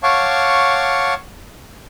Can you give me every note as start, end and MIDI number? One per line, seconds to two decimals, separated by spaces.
0.03 1.14 73
0.03 1.14 77
0.03 1.14 78
0.03 1.14 81
0.03 1.14 85
0.03 1.14 86